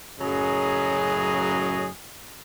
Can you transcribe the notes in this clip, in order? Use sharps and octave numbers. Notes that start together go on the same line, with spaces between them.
F#2 A2 C#3 F#3 G#4 D#5